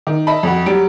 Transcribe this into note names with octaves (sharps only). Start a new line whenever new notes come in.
D#3
D#5 E5 A5 B5
F2 F#4
F#3 G3 D7